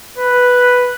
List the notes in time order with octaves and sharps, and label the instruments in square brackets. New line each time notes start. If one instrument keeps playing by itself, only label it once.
[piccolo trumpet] B4